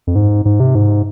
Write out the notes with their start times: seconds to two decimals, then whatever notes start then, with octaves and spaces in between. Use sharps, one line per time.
0.07 F2
0.15 G#2
0.45 G#2
0.60 C3
0.75 G#2